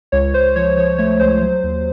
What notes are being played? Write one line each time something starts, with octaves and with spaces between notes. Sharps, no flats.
C#2 C#5
C#2 C5
F3 C#5
F3 C#5
A3 C#5
C#2 C5
F#3
D#2